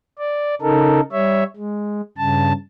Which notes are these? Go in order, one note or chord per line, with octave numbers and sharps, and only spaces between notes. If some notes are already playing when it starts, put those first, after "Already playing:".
D5
C#3 D#4 A4 A#4
G3 C#5 E5
G#3
G2 C#3 A5